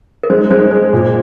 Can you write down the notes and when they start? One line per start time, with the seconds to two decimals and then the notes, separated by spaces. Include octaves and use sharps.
0.23 A#4
0.30 G#3 C5
0.50 G#3 C5
0.71 G#4 C5
0.93 A#2